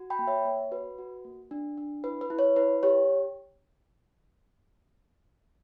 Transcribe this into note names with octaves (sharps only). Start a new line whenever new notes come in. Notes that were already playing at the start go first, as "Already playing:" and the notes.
Already playing: F#4
G5 B5
A#3
C#5 E5
A#3 C#5
F#4 B4
F#4
A#3
D4
D4
E4 B4
B4
E4
C#5
E4 B4
G4 C#5